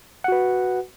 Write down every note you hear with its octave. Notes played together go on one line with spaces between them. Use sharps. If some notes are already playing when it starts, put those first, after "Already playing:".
F#4 B4 F#5